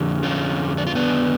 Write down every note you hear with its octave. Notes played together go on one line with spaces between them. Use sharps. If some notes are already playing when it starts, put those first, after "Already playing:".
Already playing: F2 D3
C#4 F4
D4
F4
B3 D4